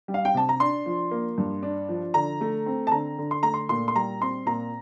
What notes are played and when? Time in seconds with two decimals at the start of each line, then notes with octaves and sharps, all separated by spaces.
0.08 G3
0.14 F5
0.25 G5
0.34 C3 A5
0.49 A#5
0.60 D4 C6
0.86 F3
1.11 A#3
1.38 G2
1.63 D4
1.89 F3
2.14 D3 A#5
2.41 A3
2.66 C4
2.87 A5
2.92 D3 A#5
3.18 D3
3.31 C6
3.43 A3 A#5
3.54 C6
3.69 A#2 C6
3.88 C6
3.96 G3 A#5
4.21 C4 C6
4.46 A#2 A#5